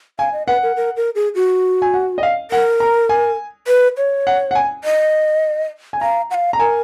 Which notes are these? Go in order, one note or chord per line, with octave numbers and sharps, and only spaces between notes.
F5 G#5
D#5
B4 F#5
A#4
A#4
A#4
G#4
F#4
G#5
F#5
D#5
F5
A#4 F#5
A#5
G#5
B4
C#5
F#5
F#5
G#5
D#5
G#5
F5 A#5
F#5
F5
A#5
A#4 G#5